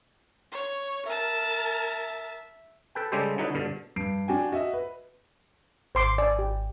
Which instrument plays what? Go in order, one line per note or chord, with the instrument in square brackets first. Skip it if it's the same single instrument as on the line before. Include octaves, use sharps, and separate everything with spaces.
[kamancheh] C#5
[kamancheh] A#4 A5 [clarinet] E5
[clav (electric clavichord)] A4 B4 G5
C#3 G3 G#3 G4 A4 C5
D3 F#3 D#4 E4 B4
G2 B2 D3
[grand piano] G2 C7 D7
D4 F#4 G5 G#5
F#4 D#5 E5
B4
[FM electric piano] G#1 [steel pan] C5 C6 D6
[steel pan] D5 G#5
G4